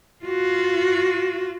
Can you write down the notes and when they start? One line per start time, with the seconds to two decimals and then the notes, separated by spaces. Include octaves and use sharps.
0.24 F4 F#4